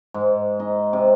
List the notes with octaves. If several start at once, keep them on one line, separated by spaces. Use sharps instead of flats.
G#2
D#4 D#5
C3